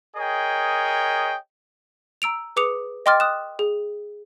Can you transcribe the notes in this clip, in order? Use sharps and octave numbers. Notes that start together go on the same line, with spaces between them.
G#4 A#4 C#5 D#5 G5
A#5 E6 D7 F7
G#4 B4 D6 D#6 C#7 F7
D#5 G5 C6 D6 F6 A6
D#6 F#6 E7
G#4